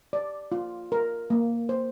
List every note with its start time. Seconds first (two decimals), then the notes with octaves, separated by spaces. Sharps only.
0.13 D5
0.52 F4
0.92 A#4
1.30 A#3
1.69 C5